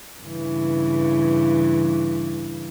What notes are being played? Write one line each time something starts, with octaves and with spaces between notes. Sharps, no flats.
G2 C#3 E3